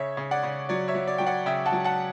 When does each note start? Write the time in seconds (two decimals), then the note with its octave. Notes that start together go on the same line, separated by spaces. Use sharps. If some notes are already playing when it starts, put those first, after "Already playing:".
Already playing: C#3 C#5 E5
0.17 C#3
0.31 D5 F#5
0.43 C#3
0.69 F#3 D5
0.88 C#5 E5
0.95 F#3
1.07 D5
1.18 F#3 G5
1.26 D5 F#5
1.46 C#3 E5 G5
1.66 F#5 A5
1.72 F#3
1.84 F#5 A5